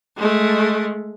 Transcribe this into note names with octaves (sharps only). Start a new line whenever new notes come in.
G#3 A3